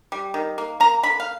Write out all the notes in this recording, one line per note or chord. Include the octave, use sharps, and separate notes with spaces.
G3
D#3
A#3
A#3 A#5
D3 B5
F5